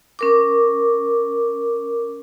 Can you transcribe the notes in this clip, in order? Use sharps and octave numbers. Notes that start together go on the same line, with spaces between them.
C#4 A#4 D6